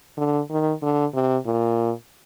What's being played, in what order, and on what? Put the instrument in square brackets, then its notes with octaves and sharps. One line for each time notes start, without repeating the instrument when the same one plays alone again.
[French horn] D3
D#3
D3
C3
A#2